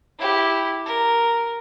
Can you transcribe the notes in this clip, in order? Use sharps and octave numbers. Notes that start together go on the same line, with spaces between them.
E4 G4
A#4